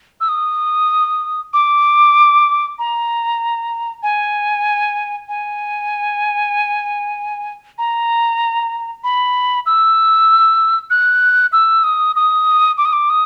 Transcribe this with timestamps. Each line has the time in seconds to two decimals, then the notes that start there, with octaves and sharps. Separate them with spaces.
0.21 E6
0.29 D#6
1.53 D6
2.79 A#5
4.03 G#5
5.28 G#5
7.78 A#5
9.04 B5
9.66 E6
10.90 F#6
11.53 E6
11.84 D#6
12.16 D#6
12.78 D6
12.85 D#6
12.93 D6
13.10 D#6